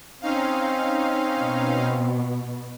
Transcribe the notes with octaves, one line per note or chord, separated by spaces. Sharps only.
C4 C#4 D#4 F5
B2